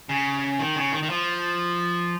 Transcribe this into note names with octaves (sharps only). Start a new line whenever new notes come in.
C#3
D#3
C#3
D#3
D#3
F3